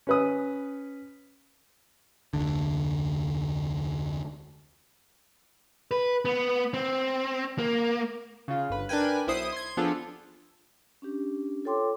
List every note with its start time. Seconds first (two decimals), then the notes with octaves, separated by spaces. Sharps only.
0.07 C#4 B4 D#6
2.34 F1 D2 D3
5.91 B4
6.25 B3
6.74 C4
7.59 A#3
8.48 C#3 F4
8.69 G1 B4
8.89 D4 A#4 B4 G5 G#5
9.27 B1 E4 C5 D#6 C7
9.52 C6 G#6
9.77 F3 B3 D4 F4 G#4 A4
11.02 C#4 D4 G4
11.65 F4 A4 C#5 G5 C6 D6